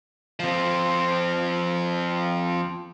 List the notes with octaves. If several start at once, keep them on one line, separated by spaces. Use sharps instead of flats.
F3 C4